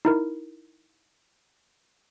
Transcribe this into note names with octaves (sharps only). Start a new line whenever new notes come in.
D#4 E4 A#4